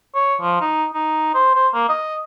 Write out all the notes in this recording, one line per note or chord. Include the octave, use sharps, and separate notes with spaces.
C#5
F3
D#4
D#4
C5
C5
A#3
D#5